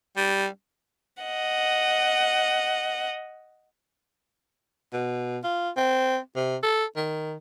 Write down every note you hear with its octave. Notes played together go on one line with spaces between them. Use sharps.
G3
D#5 F#5
B2
F4
C4
C3
A4
D#3